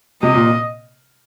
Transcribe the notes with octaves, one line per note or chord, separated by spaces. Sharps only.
C3 D#5
A#2